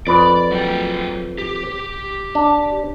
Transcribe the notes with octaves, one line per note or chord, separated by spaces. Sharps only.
F2 B4 D5
F#3 G5
G4
D4